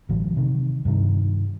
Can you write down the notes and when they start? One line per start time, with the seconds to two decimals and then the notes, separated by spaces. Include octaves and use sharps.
0.09 A1 D3 F#3
0.36 C3 D#3
0.85 G2 C3 D#3